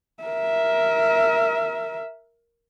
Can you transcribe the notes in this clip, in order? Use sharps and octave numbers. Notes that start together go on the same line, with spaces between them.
A#4 E5